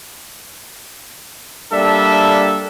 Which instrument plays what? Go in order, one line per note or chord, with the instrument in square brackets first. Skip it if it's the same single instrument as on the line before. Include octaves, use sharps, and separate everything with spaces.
[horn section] G3 A#3 D4 A4 E5